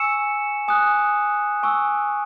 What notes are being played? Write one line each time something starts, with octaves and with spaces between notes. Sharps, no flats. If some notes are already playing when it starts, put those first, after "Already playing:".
Already playing: G#5 C#6 E6 C#7 E7
G#5 D#6 F#6
G#5 C#6 E6